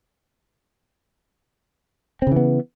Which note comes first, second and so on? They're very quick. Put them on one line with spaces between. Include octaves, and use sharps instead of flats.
C4 C#3 E3 B3